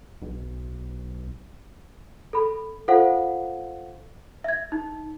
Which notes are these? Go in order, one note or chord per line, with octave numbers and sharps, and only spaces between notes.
B1
A4 B5
F4 A4 C5 F5 F#5
E5 G#6
D#4